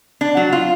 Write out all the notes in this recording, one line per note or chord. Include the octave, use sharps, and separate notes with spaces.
D4
F#3
F4